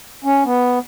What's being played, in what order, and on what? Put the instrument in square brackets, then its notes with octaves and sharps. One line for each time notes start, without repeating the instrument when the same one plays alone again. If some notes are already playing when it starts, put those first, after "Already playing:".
[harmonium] C#4
B3